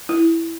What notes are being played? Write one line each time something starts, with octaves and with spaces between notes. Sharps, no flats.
E4